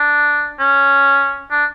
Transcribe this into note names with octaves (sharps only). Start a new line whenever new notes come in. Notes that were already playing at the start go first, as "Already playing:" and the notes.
Already playing: D4
C#4
D4